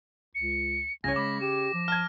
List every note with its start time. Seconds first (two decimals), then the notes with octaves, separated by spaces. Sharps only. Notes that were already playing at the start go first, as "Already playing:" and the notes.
0.35 C#2 C#7
1.04 C2 C#3 C#5 G#5 A#6
1.16 G#3 B5 D6
1.41 G4 E7
1.74 F3
1.88 A5 F6 G#6